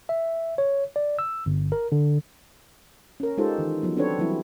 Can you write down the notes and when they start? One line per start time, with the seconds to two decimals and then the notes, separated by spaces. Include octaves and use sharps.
0.09 E5
0.58 C#5
0.96 D5
1.19 E6
1.46 G1
1.72 A#4
1.92 D3
3.20 C#4 A#4
3.38 G#3 D#4 F4 G4 A4 C5
3.58 D#3 E3
3.82 F3 F#3 B3
3.97 C4 D4 A4 B4 C#5
4.18 E3 F#3 G3 C4 E4